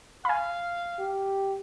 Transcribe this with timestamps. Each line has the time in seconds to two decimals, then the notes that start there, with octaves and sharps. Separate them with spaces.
0.25 F5 G#5 B5
0.99 G4